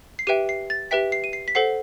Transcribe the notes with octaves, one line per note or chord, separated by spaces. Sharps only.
C7
G4 B4 E5 G5 D#7
C7
A6
G4 B4 E5 G5 B6
C7
D#7
C7
B6
A4 C5 F#5 C7